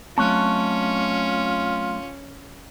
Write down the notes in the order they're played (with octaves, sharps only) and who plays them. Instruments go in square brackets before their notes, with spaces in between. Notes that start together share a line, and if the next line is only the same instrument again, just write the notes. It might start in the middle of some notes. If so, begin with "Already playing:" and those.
[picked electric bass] F#3 A3 C4 [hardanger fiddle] C#4 [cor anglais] F4 [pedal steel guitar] A5 C#6 F#6